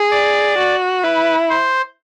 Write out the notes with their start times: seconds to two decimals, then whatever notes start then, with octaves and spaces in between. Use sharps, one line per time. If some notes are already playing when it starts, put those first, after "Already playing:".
Already playing: G#4
0.11 D5
0.57 F#4
1.03 E4 B4
1.49 C5